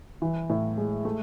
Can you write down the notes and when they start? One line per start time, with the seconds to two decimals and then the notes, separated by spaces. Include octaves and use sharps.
0.22 E3
0.50 A2
0.77 G#3
1.05 A3